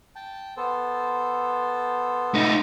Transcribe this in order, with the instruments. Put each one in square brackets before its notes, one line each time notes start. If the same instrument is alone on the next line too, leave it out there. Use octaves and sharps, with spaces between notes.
[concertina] G5 A5
B3 A4 C5
[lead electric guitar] A3 D#4